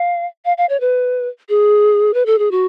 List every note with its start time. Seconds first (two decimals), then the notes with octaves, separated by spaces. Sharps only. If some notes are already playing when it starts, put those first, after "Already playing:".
Already playing: F5
0.45 F5
0.58 F5
0.69 C#5
0.80 B4
1.49 G#4
2.14 B4
2.26 A4
2.38 G#4
2.51 F#4